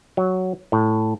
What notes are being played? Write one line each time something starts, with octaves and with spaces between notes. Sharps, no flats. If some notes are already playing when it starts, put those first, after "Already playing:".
F#3
A2